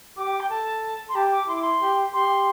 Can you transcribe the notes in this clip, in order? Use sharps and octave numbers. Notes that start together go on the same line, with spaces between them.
G4 D6
G5
A4 A5
C6
G4 A5
D6
E4 C6
D6
C6
G4
G4 C6